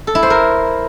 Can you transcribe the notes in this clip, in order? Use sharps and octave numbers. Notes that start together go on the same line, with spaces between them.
A4
E4
C5
A#4